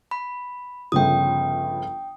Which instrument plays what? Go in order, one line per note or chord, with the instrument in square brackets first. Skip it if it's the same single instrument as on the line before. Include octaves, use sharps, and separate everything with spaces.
[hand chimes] B5
[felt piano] G1 C#3 F3 [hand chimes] G5 D#6